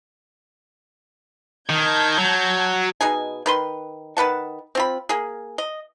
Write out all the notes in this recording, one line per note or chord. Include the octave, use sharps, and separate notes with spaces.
D#3 A5 G6 G#6
F#3
B2 D#4 G#4 G#5
D#3 B4 C6
D#3 B4 F#5 A5
C4 F4 B5
A#3 G#4
D#5